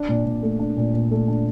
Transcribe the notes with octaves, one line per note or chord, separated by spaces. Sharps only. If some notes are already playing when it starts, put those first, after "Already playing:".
Already playing: D4
A#2
A#2
A3
D4
A#2
A#2
A3
D4